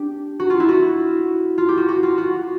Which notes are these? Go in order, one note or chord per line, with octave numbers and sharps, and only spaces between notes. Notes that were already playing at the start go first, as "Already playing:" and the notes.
Already playing: D4 G4
F#4
F4
E4
F#4
F4
G4
F#4
F#4
F4
F#4